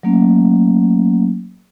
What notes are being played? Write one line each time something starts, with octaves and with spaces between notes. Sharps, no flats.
F#3 A3 A#3 C#4